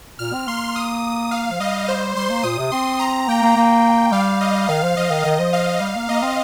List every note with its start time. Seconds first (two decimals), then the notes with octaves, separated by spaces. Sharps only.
0.19 A#2 F6
0.33 C4
0.47 A#3 C6
0.75 D#6
1.31 F5
1.51 F3
1.60 G3 D#5
1.88 C5
2.16 G3 C6
2.29 A#3
2.43 A#2 D#6
2.58 C3
2.72 C4 C6
2.99 A#5
3.28 A#3 G5
3.42 A#3
3.56 A#3
4.12 G3 F5
4.41 D#5
4.69 D#3 F5
4.83 F3
4.97 F3 D#5
5.10 D#3
5.25 D#3 D#5
5.39 F3
5.53 F5
5.80 G3
5.95 A#3
6.09 A#3 D#5
6.22 C4